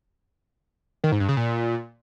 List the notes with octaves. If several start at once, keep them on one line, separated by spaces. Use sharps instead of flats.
D#3
G#2
G2
C#3
A#2